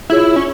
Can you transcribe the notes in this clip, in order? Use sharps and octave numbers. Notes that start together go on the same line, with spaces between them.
E4 F4 G#4 C#5
C#4